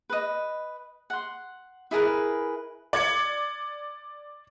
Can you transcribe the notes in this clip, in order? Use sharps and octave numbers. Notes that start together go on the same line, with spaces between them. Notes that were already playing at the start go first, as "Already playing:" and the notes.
B4 D#5
F#5 C6
E4 G#4 A#4 B4
D5 G#6 C#7